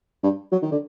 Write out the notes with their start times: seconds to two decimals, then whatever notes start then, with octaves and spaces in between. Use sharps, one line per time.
0.23 G2
0.52 F#3
0.62 D#3
0.71 D3